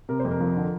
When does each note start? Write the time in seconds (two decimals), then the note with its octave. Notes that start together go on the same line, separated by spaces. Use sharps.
0.09 C3 A#4
0.20 C5
0.25 F2
0.31 A#4
0.40 F3
0.56 D3